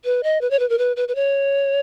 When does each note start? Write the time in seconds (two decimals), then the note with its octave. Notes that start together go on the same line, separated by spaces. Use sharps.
0.05 B4
0.23 D#5
0.41 B4
0.51 C#5
0.59 B4
0.69 A#4
0.78 B4
0.96 B4
1.08 B4
1.15 C#5